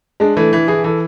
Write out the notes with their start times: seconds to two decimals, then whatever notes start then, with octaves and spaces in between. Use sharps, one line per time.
0.20 G#3 D4
0.37 E3 A3
0.53 E3
0.68 E3 G#4
0.84 E3 A4